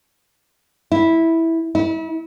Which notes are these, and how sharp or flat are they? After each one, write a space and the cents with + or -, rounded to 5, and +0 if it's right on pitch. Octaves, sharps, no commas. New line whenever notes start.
E4 -10
E4 -35